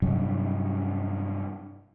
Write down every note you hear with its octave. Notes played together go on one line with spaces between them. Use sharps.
G2 C3 F#3 G3